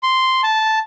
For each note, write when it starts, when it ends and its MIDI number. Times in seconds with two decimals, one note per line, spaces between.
0.03 0.41 84
0.44 0.79 81